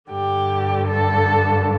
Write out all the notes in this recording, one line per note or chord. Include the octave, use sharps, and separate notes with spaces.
G2 D3 G4
A4